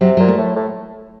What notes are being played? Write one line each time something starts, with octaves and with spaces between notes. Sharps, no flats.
C3 F#3
A#2 F#3
A3
A2
A2